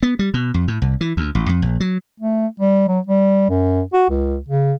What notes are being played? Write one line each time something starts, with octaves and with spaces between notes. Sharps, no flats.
B3
G3
B2
F2
A2
C2
E3
D2
A1
F2
A#1
F#3
A3
G3
F#3
G3
F#2
F#4
C#2
C#3